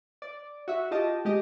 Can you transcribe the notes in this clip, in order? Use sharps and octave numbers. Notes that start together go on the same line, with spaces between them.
D5
F#4 E5
F4 G4 D#5 A5
G#3 G4 D#5